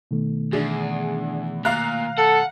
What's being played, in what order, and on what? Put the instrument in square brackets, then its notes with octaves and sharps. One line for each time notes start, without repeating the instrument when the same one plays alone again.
[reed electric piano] B2 D#3 A3
[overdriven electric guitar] E2 [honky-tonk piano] D4 G#4
[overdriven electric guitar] A#2 [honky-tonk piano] F5 A#5 F#6
[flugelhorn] A4 [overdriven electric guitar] F#5